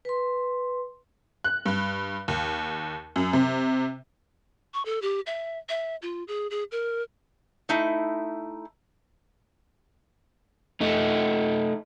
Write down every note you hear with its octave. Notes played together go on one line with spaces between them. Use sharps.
B4 C6
F#6
G2
D#2
F#2
C3
C#6
A4
G4
E5
E5
F4
G#4
G#4
A#4
A3 D#4 E4
A3 D#4